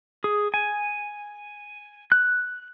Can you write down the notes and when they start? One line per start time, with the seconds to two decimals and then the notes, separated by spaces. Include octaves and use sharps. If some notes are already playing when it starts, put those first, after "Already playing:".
0.24 G#4
0.54 G#5
2.12 F#6